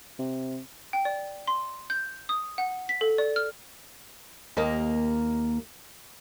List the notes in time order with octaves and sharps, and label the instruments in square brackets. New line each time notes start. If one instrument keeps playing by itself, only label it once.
[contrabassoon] C3
[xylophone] G5
D5
C6
G6
D#6
F#5
B6
A4
D5
F6
[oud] D#2 A#3 D#5